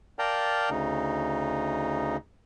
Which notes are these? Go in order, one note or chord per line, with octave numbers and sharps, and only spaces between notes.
A#4 D5 F5 G5 A5 A#5
D2 C#3 D#4